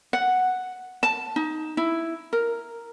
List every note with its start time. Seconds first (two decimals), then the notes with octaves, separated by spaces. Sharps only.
0.13 F#5
1.03 A5
1.36 D#4
1.77 E4
2.33 A#4